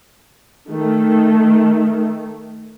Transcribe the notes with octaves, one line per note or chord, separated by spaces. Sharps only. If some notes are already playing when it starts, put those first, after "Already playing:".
D#3 A3